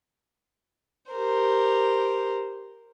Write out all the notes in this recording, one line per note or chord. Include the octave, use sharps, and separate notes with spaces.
G4 A#4 C5